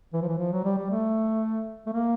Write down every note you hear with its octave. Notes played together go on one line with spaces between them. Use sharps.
E3
F3
E3
F3
F#3
G3
G3
A3
A3
A#3